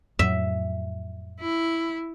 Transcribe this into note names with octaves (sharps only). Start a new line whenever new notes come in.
F2 A2 F#3 E5
E4